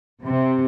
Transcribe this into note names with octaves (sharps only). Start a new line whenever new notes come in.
C3